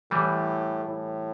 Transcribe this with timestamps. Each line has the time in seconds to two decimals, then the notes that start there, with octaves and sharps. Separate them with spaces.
0.11 A2 E3 G3
0.85 A2